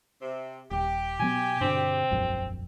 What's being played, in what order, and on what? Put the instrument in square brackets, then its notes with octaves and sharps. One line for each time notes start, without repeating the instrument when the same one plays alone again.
[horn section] C3
[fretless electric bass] D#1 [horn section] G4
[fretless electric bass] B2 F#3 B3 [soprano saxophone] G#5
[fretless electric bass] G2 B2 D3 [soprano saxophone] C4
[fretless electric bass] E1 A#1 F#2